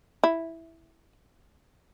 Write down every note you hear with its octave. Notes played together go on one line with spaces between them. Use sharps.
E4